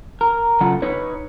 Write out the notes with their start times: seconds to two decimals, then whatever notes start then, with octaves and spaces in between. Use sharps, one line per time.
0.21 A#4
0.61 C#3 F#3 F4 A4 F#5
0.82 D#4 B4 C#5